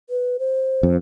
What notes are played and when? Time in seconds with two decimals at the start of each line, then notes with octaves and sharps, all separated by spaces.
0.10 B4
0.39 C5
0.83 F2